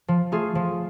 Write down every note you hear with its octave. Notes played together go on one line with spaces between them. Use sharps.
F3
A3 F4 G#4
F3